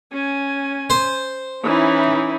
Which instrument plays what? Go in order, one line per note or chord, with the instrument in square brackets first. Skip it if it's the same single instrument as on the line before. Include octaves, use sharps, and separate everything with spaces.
[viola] C#4 G#5
[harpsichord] C5
[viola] E3 D#4 [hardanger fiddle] C#4 E4